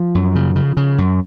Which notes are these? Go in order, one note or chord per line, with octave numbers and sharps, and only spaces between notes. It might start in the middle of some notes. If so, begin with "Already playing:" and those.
Already playing: F3
F#2
C#3
C#3
C#3
F#2